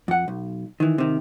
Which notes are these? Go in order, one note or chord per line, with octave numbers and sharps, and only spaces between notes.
F2 F#5
B1
D#3 E3
C3 D#3